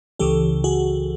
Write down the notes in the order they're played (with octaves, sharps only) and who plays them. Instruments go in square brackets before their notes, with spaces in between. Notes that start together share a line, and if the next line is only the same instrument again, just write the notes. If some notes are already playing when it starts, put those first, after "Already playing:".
[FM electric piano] C#2 C#3 E3 G4 A4
F#4 G#4